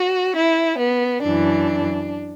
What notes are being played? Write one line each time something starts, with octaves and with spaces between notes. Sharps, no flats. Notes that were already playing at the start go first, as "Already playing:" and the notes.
Already playing: F#4
E4
B3
F#2 E3 D4